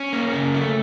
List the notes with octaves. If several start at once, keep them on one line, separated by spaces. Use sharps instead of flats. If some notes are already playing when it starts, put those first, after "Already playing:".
Already playing: C#4
A#3
C#3
A3